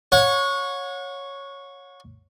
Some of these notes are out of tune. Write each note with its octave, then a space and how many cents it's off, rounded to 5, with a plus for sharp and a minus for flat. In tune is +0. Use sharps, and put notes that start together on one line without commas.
C#5 +0 F#5 -35